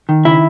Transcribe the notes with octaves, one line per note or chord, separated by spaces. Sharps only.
D#3
C#3 E4 E5